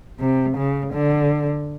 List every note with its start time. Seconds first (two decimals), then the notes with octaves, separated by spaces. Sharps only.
0.19 C3
0.57 C#3
0.94 D3